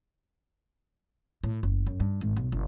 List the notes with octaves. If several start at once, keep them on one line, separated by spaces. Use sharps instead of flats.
A2
F#1
F#2
G2
G#1
B1
F#1